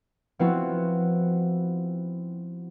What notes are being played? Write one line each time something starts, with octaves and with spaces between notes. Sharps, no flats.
F3 B3 C4 E4 F#4